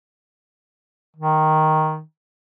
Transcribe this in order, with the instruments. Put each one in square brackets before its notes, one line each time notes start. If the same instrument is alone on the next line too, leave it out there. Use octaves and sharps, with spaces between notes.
[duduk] D#3